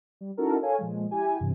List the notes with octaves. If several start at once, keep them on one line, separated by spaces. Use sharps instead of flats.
G3
C#4 D#4 E4 F#4 A4 A#4
A4 C#5 F5 G#5
A#2 F3 G#3
E4 G4 G#5
E2 G2 C3